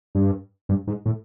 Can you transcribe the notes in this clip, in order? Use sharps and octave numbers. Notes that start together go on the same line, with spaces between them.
G2
G2
G#2
A2